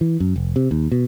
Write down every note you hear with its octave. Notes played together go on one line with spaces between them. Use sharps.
E3
F#2
F1
C3
D#2
B2